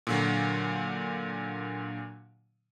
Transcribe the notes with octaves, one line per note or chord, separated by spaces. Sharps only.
A#2 D3 F#3